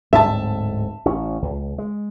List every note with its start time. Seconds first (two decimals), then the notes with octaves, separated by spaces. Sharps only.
0.13 D1 G#2 C4 E5 A5
1.05 A1 C#4
1.42 C#2
1.78 G#3